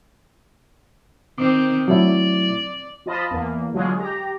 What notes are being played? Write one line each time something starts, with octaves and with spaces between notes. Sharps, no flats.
D#3 C4 D6
F#3 A3 E4 D5
F3 F4 D#5 A5 B5
E2 A#3
D3 F#3 G#3 F4 G#4
G4 A#5